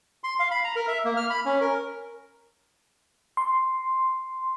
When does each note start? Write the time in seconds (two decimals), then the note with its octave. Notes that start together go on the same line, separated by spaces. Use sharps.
0.24 C6
0.39 F5
0.51 B5
0.64 A#5
0.76 A#4
0.88 E5
1.05 A#3
1.17 F6
1.30 B5
1.45 C#4
1.61 A#4
3.37 C6